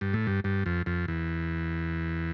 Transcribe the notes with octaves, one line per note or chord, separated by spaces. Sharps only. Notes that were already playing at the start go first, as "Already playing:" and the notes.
G2
A2
G2
G2
F2
F2
E2